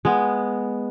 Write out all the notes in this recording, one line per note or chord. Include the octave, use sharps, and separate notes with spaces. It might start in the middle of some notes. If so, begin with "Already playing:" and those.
G#3 B3